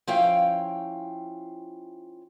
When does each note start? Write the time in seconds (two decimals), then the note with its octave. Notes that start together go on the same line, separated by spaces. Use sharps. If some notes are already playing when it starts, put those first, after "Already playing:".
0.07 F3 C#4 E4 F5 G5